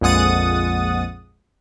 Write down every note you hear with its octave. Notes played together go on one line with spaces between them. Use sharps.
A#1 F2 G#3 F#5 D#6 A6